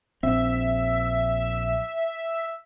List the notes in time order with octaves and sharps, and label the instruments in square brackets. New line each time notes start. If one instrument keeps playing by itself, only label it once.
[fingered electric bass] A#1 C4 [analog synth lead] E5